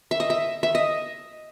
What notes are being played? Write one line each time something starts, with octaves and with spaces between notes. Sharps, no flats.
E5
D#5
E5
E5
D#5